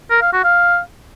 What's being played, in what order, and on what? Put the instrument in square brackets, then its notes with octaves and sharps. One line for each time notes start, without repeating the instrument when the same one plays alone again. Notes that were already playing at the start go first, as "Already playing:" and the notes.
[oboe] A#4
F5
F#4
F5